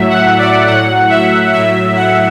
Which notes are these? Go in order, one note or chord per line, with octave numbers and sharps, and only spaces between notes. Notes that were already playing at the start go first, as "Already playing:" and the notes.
Already playing: A2 F#3 E5
F#5
D5
A2 F#3 F#5
E5
A2 F#3 E5
F#5